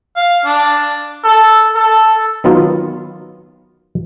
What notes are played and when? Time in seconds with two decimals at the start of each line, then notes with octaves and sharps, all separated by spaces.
0.16 F5
0.45 D4
1.24 A4
1.75 A4
2.44 D#3 F#3 B3 F4